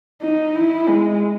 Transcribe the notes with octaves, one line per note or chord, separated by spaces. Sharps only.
D#4
E4
G#3